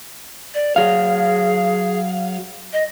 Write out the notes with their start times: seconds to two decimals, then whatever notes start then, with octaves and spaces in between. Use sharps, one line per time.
0.54 D5
0.76 F#3 G#4 F5
2.73 D#5